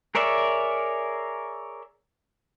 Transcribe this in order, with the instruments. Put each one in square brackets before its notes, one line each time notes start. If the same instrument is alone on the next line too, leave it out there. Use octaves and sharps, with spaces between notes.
[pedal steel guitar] G#4 A#4 C#5 D5 E5